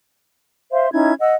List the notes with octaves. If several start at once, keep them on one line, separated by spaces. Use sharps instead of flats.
C5 E5 F5 C6
C#4 D#4 E4 G#6
D#5 F#5 E6